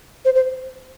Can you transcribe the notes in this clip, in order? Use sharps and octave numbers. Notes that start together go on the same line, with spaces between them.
C5
C5